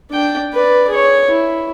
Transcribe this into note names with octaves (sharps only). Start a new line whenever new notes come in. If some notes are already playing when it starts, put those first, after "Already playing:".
D4 G5
B4 D5
G#4 C#5
E4